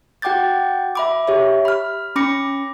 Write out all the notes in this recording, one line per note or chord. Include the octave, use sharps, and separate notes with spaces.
F#4 F#5 G5 D6 G6 A6
E5 B5 D6
G4 C#5 E5
B5 F6
C#4 B5 D6 A#6 C#7